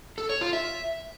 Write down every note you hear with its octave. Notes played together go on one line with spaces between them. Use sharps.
A4
C#5
F4
E5